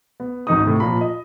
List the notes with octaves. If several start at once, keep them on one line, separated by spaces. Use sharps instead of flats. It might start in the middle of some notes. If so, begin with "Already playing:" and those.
B3
G#1 D#3 D#4 D#6
A2 C3
A#2 F3 A#5 B5
D#5